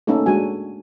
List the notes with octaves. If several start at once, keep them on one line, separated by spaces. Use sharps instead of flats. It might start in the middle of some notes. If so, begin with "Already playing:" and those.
A3 A#3 C#4 D#4 A4
G#3 D4 F#4 G#5